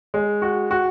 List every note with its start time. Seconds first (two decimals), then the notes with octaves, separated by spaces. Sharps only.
0.14 G#3
0.42 F#4
0.71 F#4